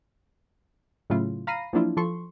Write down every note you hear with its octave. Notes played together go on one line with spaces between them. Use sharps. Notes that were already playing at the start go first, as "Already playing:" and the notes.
A2 C#3 F#3 A3 E4 F4
F5 A#5 B5 A#6 C7 D#7
F3 F#3 A#3 D4 E4 F4
F3 A4 C6 C#6